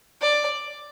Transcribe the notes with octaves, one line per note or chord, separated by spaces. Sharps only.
D5